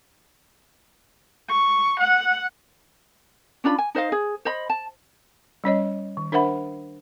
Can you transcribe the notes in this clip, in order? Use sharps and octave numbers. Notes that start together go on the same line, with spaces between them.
C#6
F#5
C#4 D4 F4 B5
G#5
D#4 C5 D#5 F5
G#4
C5 D#5 B5
A5
G3 C#4 C#5 D#5
D#3
D4 A#4 C5 E5 F#5 B5